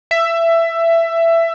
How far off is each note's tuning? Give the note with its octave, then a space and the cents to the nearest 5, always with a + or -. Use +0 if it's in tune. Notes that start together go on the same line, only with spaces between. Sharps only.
E5 +15